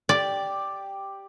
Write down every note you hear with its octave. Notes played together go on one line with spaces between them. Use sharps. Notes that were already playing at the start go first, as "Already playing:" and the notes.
G4 D5